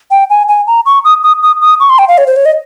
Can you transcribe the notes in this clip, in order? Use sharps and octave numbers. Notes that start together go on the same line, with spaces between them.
G5
G#5
G#5
A#5
C#6
D#6
D#6
D#6
D#6
C#6
C6
G5
F5
C#5
C5
C#5
D#5